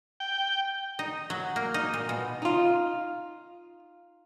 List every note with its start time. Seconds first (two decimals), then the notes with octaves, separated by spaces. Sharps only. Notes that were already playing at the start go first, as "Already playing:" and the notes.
0.20 G5
0.99 D#4
1.30 F#3
1.56 A#3
1.74 D#4
1.94 A#2
2.09 B2
2.42 D#4 F4